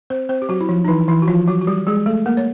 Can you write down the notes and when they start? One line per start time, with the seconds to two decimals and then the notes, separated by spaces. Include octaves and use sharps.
0.10 C4 C5
0.29 C4 C5
0.42 G4
0.49 F#3 F#4
0.61 E4
0.69 F3 F4
0.85 D#4
0.88 E3 E4
1.08 E3 E4
1.22 F#4
1.27 F3 F4
1.48 F#3 F#4
1.61 F#4
1.67 G3 G4
1.87 G#3 G#4
2.06 A3 A4
2.26 A#3 A#4
2.37 C#5